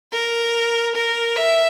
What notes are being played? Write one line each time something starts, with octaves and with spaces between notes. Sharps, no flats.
A#4
A#4
E5